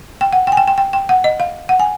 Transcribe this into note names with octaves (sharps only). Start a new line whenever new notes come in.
G5
F#5
G5
G#5
G5
G5
G5
G5
F#5
D#5
F5
F#5
G#5